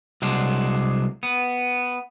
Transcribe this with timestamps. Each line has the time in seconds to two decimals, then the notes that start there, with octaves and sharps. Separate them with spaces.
0.22 C2 F#3 G#3 D4
1.23 B3